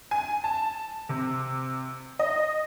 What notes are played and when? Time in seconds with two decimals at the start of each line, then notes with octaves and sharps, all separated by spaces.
0.11 G#5
0.44 A5
1.09 C3
2.19 D#5